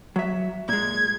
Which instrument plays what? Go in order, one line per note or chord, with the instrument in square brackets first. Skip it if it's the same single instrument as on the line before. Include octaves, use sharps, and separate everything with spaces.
[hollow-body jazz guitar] F#3 E5
[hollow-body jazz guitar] A#2 G#3 [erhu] G#6